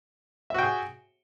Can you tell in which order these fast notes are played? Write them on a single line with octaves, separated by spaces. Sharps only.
E5 F#4 G5 G#4